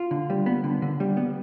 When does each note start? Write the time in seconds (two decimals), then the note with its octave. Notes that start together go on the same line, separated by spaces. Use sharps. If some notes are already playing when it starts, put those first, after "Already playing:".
Already playing: F4
0.11 D3
0.30 G3
0.46 B3
0.64 D3
0.82 D3
1.00 G3
1.17 B3